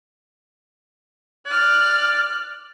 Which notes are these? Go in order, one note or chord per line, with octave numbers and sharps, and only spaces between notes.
D5 F6 F#6